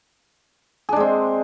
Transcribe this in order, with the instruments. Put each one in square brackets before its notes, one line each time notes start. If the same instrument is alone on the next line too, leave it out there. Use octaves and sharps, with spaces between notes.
[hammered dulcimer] G#4
D4
G#3
C4